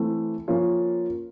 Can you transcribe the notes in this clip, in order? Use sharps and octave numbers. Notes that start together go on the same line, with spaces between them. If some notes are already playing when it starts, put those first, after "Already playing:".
Already playing: E3 A3 C4
F3 A#3 C#4 F4